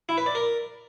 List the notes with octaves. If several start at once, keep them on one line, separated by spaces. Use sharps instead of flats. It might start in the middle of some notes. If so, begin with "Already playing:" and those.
E4
B4
D5
A#4